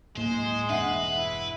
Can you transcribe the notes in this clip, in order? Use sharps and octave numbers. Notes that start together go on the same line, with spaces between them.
D1 A2 G#3 A#3 C5
E1 G2 D4 B4 E5 F#5 C7
E4